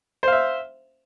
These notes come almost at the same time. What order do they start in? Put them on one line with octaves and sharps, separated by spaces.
C5 F5 E5